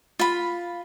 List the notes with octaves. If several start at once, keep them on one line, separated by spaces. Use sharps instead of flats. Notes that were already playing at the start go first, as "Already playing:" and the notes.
F4 B5